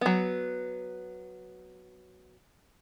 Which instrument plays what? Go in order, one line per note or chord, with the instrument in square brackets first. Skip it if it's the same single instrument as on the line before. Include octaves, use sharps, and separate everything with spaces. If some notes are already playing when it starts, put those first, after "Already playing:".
[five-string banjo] F#3 B3